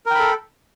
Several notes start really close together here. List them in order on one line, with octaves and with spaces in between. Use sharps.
A#4 G5 B5 A4